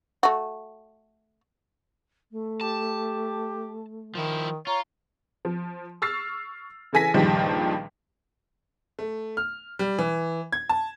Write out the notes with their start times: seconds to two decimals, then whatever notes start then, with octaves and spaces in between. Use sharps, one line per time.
0.23 A3 F#4
2.31 A3
2.61 G4 A5
4.15 D#3 F3 E4
4.67 F4 C#5 A#5
5.45 F3
6.02 C#6 E6 F6 A6 C7
6.93 C#3 E3 A4 G#5 A#6 B6
7.14 C#2 G2 A#2 D#3 F3 G3
8.99 A3
9.37 F6
9.79 G3
9.99 E3
10.52 G#6
10.69 A5